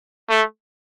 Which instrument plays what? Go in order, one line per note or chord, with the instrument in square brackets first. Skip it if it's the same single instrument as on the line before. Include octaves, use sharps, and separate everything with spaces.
[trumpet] A3